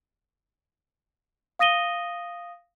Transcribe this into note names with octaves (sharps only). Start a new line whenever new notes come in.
F5 D#6 A#6 D#7 G7